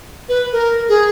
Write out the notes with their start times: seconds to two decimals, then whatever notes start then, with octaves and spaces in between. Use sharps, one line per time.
0.29 B4
0.52 A#4
0.89 G#4